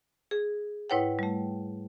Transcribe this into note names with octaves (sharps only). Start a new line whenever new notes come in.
G#4
G#2 E4 B4 C#5 F#5 G5
G3 A3